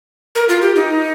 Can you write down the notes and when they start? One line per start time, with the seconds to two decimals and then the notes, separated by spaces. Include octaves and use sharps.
0.35 A#4
0.49 F4
0.62 G4
0.76 D#4